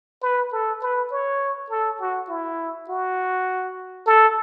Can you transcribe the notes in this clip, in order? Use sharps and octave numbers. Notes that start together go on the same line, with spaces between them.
B4
A4
B4
C#5
A4
F#4
E4
F#4
A4